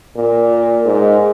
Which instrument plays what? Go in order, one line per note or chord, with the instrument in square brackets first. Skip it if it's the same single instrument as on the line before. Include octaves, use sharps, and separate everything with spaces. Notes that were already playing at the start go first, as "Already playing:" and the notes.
[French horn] A#2
G#2